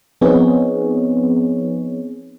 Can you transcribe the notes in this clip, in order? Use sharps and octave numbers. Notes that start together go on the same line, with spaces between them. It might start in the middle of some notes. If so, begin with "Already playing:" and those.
F3 B3 C4 D#4 G#4 C#5